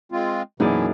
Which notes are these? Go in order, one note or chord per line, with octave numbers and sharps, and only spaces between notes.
G#3 C4 F4
F#2 B2 E3 A#3 D#4 E4 G#4 D5